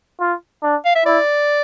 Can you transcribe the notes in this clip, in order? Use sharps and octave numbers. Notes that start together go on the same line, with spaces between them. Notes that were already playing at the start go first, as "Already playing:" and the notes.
F4
D4
F5
E5
E4 D5